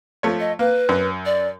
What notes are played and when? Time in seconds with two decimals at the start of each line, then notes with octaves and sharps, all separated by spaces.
0.23 F3 A3 C#5
0.40 D#5
0.59 A#3 B4
0.89 F#2
1.26 D5